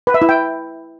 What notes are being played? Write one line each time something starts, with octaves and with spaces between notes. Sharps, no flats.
B4
E5
E4
G5